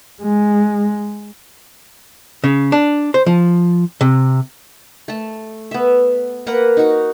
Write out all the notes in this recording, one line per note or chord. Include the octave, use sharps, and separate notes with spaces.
G#3
C#3
D4
C5
F3
C3
A3 A5
B3 E5
A#3 A#4 B4 F#5
D#4 F#4